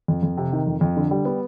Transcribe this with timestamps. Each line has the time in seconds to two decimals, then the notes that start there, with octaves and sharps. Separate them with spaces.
0.08 F2
0.23 F2
0.37 C3
0.53 D#3
0.67 F2
0.81 F2
0.97 D3
1.11 G3
1.25 B3